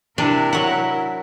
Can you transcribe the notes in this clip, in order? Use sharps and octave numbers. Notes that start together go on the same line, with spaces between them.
C3 D4 E4 A#4
F#3 F#5